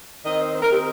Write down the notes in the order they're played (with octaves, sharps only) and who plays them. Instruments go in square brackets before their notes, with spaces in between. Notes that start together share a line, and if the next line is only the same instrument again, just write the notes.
[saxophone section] D#3 C4 D#4 D#5
C5
C5
A#4
D#3 C4 D#4 G4